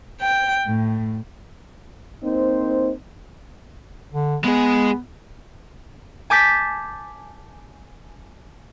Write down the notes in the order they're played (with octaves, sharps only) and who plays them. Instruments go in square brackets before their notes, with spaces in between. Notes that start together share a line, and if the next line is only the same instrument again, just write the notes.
[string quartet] G5
A2
[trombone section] A#3 C4 D#4 C5
[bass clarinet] D3
[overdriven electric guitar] G#3 G#4 [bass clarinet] B3
[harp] G#5 A5 D6 G6 A6 B6